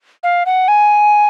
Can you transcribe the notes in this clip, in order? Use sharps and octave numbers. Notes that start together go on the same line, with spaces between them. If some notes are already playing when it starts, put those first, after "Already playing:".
F5
F#5
G#5